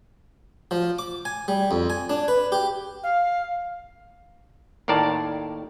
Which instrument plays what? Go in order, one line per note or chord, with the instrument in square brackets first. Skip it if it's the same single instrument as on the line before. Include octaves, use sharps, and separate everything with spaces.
[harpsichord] F3
D6
G#5
G3
F2
G#5
D4
B4
G4
[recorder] F5
[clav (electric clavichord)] D#2 A2 A#4 D5 A5